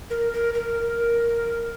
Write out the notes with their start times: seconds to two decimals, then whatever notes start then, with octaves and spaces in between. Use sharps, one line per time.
0.10 A#4
0.33 A#4
0.54 A#4